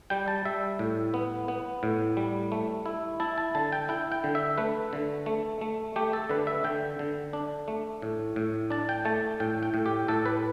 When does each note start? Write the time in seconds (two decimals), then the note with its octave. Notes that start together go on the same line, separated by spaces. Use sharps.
0.10 G3 G5
0.28 A5
0.45 G3 E5
0.79 A2
1.14 B3
1.48 B3
1.83 A2
2.17 G3
2.52 A3
2.86 E4
3.20 E4 A5
3.38 A5
3.55 D3 A5
3.72 G5
3.89 E4 G5
4.12 G5
4.24 D3
4.35 E5
4.58 A3 B4
4.93 D3
5.26 A3
5.61 A3
5.96 A3 G4
6.13 A4
6.30 D3 B4
6.47 E5
6.64 D3 G5
6.99 D3
7.33 D4
7.68 A3
8.02 A2
8.36 A2
8.70 D4 A5
8.89 G5
9.05 A3 A5
9.40 A2 G5
9.63 G5
9.74 A2
9.86 G4
10.08 A2 A4
10.26 B4